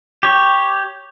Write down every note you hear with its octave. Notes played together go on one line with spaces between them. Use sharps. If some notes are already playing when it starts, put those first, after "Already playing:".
G4 C#5